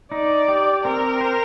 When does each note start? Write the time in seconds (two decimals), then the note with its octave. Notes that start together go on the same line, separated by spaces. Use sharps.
0.12 D#4 D5
0.48 G4
0.84 C4 A#4
1.21 C5